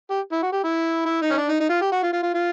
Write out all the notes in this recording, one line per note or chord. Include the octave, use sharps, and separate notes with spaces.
G4
E4
F#4
G4
E4
E4
D#4
C#4
D4
D#4
D#4
F4
G4
F#4
F4
F4
F4
F4